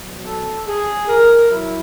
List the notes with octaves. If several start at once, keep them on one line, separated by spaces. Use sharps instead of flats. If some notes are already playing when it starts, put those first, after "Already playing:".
Already playing: B2 F#3
A4
G#4
A#4
F#3 E4